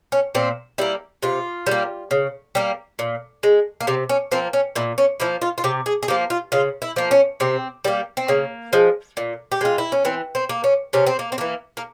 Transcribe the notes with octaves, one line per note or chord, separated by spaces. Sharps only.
C#4
A#2 C4
G3 A#3 E4
C3 F4
G3 A#3
C#3
G3 A#3
A#2
G#3
A#3
C3 C4
C#4
F3 A#3 C4
C#4
A#2 E4
C#4
F3 A#3 E4
F4
F4
C3 G4
G#4
G#4
F3 A#3 G4
F4
C#3 F4
E4
F3 A#3
C#4
C3 C4
G3 A#3
C4
C#3 A#3
F3 G#3
A#2
G4
G#3 F4
E4
C#4
E3 C4
C4
A#3
C#4
C3 C#4
C4
A#3
C4
E3 A#3
A#3